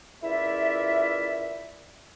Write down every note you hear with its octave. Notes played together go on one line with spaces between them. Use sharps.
C#2 E4 F4 A#4 D5 E5